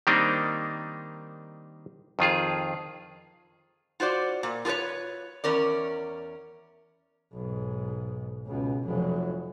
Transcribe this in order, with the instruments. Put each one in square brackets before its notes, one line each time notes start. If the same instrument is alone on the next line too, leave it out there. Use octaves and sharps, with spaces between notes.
[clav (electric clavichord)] D#3 G3 A#3 C4 D4 D#4
F2 D#3 F4 G#4
[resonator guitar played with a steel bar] F4 F#4 C5 D5
A#2
F4 G#4 A4 B4 C#5
E2 C#4 A#4 D5
[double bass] B1 G#2
C#2 B2
F1 F#3